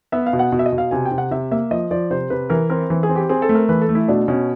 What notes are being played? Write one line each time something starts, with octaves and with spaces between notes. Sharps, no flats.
B3 E5
F5
B2
F#5
B2
E5
D#5
B2
F5
C3 G#5
G5
C3
F#5
C3 E5
A#3 E5
F3 D#5
F3 D5
C3 C5
C3 B4
E3 A#4
C4 A#4
E3
G#4
C4
G4
C4 G#4
A4
A3
A#4
E3 B4
A4
A3
E4
B2 D4
B2 C#4